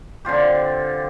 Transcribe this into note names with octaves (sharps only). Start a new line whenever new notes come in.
D3 C4 F4 G4